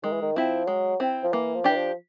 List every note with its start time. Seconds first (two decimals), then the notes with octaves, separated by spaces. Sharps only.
0.03 D#3 G#3
0.13 E3
0.21 D#3
0.36 F3 C4 E4
0.67 F#3 G#3
1.00 C4 E4
1.23 F3
1.32 E3 A#3
1.55 F3
1.64 E3 D4 G4
1.75 F3